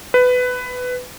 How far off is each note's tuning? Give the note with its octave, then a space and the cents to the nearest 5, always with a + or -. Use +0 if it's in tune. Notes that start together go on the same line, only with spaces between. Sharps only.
B4 +15